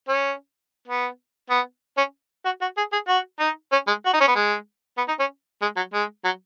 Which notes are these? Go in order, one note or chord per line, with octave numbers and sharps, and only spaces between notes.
C#4
B3
B3
C#4
F#4
F#4
G#4
G#4
F#4
D#4
C#4
G#3
F#4
D#4
C#4
B3
G#3
B3
D#4
C#4
G#3
F#3
G#3
F#3